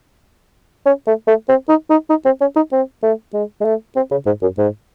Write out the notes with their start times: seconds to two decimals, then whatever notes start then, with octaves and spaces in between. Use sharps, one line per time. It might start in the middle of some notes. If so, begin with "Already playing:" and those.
0.86 C#4
1.07 A3
1.27 A3
1.49 C4
1.69 D#4
1.90 D#4
2.10 D#4
2.25 C4
2.41 C#4
2.56 D#4
2.72 C4
3.03 A3
3.34 G#3
3.60 G#3
3.65 A3
3.96 C4
4.11 C#3
4.26 G#2
4.42 F#2
4.58 G#2